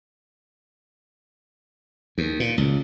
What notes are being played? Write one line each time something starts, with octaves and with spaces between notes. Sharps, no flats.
D#2
A#2
C#2